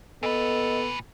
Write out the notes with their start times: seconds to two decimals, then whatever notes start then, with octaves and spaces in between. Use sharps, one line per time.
0.23 A#2 B3 A4 B4 D#5